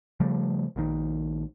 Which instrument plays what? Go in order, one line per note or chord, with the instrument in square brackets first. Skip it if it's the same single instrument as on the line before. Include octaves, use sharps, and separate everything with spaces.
[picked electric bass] C#3 F3 G3 A3
A#1 A#2 D#3